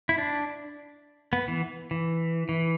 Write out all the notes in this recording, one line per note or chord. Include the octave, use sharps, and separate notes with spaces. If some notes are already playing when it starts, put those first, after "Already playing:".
E4
D4
B3
E3
E3
E3